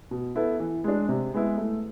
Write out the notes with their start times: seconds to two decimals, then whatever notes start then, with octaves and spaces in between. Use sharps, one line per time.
0.11 B2
0.35 B3 E4 A4
0.60 E3
0.84 G#3 D4
1.09 C3
1.34 G#3 B3 E4
1.57 A3